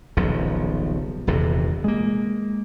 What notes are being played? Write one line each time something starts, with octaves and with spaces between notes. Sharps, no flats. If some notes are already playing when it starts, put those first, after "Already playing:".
D#1 B1 C#3 F3
D#1 E2 G2 C3
G#3 A#3